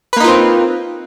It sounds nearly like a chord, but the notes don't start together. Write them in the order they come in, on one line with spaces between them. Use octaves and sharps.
B4 A#3 D#4 F4 C4